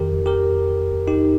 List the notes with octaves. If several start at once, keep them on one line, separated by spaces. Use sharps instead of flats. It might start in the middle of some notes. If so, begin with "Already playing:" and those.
Already playing: F2 D#3 G4 A#4
G4 A#4
D#4 G4